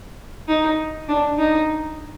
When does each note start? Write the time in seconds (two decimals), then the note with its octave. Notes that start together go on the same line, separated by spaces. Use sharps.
0.48 D#4
1.09 D4
1.38 D#4